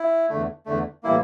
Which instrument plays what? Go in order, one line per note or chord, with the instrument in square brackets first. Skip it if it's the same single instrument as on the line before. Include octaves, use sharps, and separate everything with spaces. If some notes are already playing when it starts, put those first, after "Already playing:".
Already playing: [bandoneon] E4
E2 D3 A3
E2 D3 A3
A2 E3 G3 A#3 E4